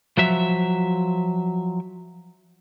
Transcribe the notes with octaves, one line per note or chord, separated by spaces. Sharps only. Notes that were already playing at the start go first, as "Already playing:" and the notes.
F3 F#3 E5